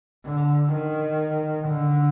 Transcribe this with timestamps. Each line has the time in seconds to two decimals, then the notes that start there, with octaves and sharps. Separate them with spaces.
0.26 D3
0.74 D#3
1.69 D3